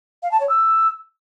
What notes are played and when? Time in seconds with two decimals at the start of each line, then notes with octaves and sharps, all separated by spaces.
0.23 F5
0.32 A5
0.40 C#5
0.49 E6